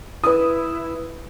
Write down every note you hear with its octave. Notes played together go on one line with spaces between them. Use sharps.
E4 B4 D#6